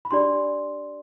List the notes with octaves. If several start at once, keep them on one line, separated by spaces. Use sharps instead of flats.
B5
D4 G4 D5 C6